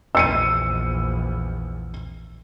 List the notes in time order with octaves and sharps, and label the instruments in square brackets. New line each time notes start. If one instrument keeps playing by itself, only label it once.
[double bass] A#1 E2 [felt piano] E6 C#7 D#7